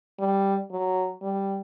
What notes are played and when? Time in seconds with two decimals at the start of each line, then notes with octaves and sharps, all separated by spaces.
0.19 G3
0.71 F#3
1.22 G3